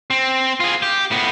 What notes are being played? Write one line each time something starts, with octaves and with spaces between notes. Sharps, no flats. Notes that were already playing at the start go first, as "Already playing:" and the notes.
C4
F4 G#4
G4
A2 B3